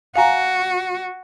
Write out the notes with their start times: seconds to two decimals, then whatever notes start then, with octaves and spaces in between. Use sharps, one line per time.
0.16 F#4 F5 G#5 A#5